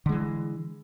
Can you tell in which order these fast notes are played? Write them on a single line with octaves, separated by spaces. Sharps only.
D3 G#3 E3